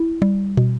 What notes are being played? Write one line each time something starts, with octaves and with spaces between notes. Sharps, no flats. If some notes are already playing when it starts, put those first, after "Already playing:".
Already playing: E4
G3
B2